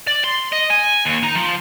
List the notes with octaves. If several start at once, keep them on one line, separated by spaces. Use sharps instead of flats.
D5
C6
D#5
G#5
D#2
D#4
F3